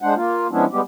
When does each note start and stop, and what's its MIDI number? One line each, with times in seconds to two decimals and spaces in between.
0.02 0.14 56
0.02 0.14 62
0.02 0.14 72
0.02 0.14 78
0.16 0.47 58
0.16 0.47 65
0.51 0.65 53
0.51 0.65 56
0.51 0.65 59
0.51 0.65 61
0.51 0.65 62
0.51 0.65 64
0.72 0.81 55
0.72 0.81 56
0.72 0.81 59
0.72 0.81 67